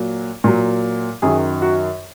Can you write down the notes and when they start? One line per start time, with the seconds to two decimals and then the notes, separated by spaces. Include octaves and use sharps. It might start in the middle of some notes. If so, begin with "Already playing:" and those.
Already playing: A#2 F#3
0.44 A#2 F#3
1.22 F#2 D#3 F#3 G#4
1.62 F#4